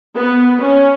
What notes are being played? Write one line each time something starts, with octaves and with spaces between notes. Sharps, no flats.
B3
C#4